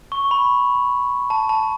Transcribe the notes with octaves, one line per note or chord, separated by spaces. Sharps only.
C#6
B5
A5
A5